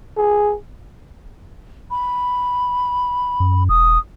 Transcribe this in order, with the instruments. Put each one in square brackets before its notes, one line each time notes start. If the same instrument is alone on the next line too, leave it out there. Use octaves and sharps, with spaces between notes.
[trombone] G#4
[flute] B5
[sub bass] F#2
[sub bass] E1 [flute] D#6